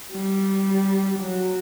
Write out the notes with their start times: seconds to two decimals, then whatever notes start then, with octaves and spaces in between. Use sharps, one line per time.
0.12 G3
1.20 F#3